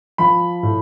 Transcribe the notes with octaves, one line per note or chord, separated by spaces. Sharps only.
F3 B5
A2